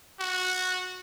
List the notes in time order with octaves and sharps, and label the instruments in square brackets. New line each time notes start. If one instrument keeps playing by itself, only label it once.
[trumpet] F#4